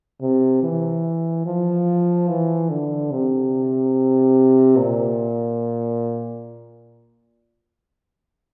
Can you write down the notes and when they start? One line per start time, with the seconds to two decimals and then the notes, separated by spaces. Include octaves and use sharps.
0.21 C3
0.63 E3
1.46 F3
2.29 E3
2.70 D3
3.12 C3
4.77 A#2